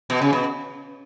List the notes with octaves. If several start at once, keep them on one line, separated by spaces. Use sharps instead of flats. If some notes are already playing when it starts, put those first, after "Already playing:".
B2
C#3
B2